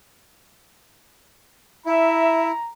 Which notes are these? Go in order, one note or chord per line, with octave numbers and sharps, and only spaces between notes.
E4 E5 A#5